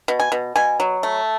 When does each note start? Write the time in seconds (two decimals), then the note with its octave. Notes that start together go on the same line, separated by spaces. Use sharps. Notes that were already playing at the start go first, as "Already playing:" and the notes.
0.08 B2
0.20 G#5
0.32 B2
0.56 B2 G#5
0.80 F#3
1.03 A3